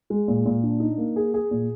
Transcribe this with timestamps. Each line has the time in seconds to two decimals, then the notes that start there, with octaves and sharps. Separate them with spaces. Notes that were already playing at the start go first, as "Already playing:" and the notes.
0.10 G#3
0.28 A#2
0.46 A#2
0.63 D4
0.80 D#4
0.98 A#3
1.16 G#4
1.34 G#4
1.51 A#2